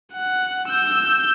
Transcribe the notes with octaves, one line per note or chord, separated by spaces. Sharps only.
F#5
E6 G6